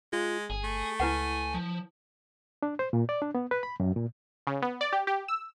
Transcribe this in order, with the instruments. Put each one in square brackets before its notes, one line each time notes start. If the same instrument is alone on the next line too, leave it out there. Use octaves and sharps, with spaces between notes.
[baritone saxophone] G#3 [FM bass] F4
[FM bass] G1 [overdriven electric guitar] G#4
[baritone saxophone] A3
[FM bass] C#2 [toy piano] E4 B4 F#5 [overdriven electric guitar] G#5
[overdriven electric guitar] F3
[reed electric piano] D4
C5
A#2
D5
D4
B3
B4
B5
F#2
A#2
[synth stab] C#3
B3
D5
G4
G4
E6